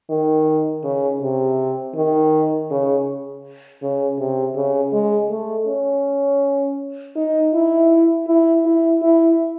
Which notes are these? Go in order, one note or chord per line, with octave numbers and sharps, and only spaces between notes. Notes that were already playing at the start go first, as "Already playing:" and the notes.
D#3
C#3
C3
D#3
C#3
C#3
C3
C#3
G#3
A3
C#4
D#4
E4
E4
E4
E4